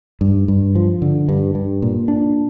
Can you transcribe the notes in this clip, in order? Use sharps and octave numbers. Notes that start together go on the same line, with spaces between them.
G2
G2
F3
D3
G2
G2
A#2
D4